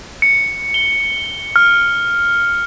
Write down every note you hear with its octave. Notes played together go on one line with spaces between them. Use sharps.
C#7
G7
F6